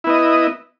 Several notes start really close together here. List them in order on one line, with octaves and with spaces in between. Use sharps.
E4 B3 D#5